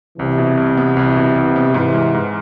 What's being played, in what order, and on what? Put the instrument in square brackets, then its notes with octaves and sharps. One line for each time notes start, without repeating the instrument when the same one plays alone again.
[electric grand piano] C2 [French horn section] C3 E3
[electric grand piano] B2
C2
B3
C2
B2
C2
B3
[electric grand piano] G#2 [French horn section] C3 E3
[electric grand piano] G#3
G#2